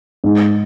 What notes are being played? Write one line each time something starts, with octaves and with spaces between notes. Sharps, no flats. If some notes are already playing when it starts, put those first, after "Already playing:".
G#2